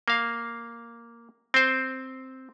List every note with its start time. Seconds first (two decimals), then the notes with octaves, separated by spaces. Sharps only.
0.08 A#3 F5
1.54 C4 C5